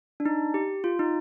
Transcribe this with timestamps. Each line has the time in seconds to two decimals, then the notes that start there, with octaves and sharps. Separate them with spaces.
0.20 D4
0.25 D#4
0.54 G4
0.84 F4
0.99 D#4